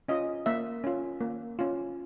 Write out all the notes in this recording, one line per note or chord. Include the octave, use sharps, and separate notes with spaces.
C#4 F4 D#5
A#3 E5
C#4 F4
A#3
C#4 F4